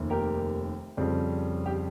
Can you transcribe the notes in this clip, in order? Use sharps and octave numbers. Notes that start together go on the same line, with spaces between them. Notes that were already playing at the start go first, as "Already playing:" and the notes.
Already playing: F1 D#2 D#3
G4 A#4
F2 C#3 G3 C4
G4